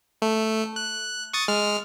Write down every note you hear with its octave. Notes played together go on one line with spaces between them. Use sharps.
A3
F#6
C#6 D#6 A6
G#3 F6